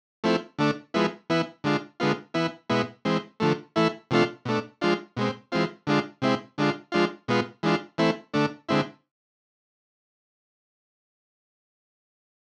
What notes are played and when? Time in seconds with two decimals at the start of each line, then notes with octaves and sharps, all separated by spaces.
0.24 F3 A3 C4 E4
0.59 D3 A3 D4
0.94 F3 G#3 B3 E4
1.30 E3 B3 E4
1.64 D3 G#3 D4 F4
2.00 D3 G#3 B3 F4
2.34 E3 B3 E4
2.70 B2 G#3 B3 E4
3.05 E3 G#3 C4
3.40 D3 F3 A3
3.76 E3 A3 E4
4.11 C3 F3 A3 D4 F4
4.45 B2 A3 D4
4.81 F3 G#3 D4 F4
5.17 B2 G#3 C4
5.52 E3 G#3 C4 F4
5.87 D3 G#3 D4 F4
6.22 C3 G#3 C4 E4
6.58 D3 G#3 D4 F4
6.92 F3 G#3 D4 F4
7.28 B2 G#3 B3 F4
7.63 E3 G#3 D4 F4
7.98 E3 A3 C4 E4
8.34 D3 A3 D4
8.69 D3 G#3 C4 E4